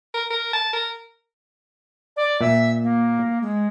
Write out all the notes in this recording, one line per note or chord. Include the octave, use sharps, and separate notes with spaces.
A#4
A#4
A5
A#4
D5
A#2 E5
A#3
G#3